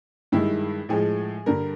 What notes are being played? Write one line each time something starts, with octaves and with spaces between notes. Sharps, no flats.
G2 D#3 G#3 E4
A2 F3 G#3 G#4
G2 D3 G3 A#4